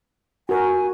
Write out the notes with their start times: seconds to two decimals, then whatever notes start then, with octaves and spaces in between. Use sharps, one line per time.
0.49 F#4 A#4 G#5